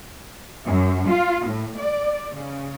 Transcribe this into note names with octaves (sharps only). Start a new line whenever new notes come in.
F#2
F4
A2
D5
C#3